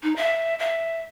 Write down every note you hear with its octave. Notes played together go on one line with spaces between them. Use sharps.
D#4
E5
E5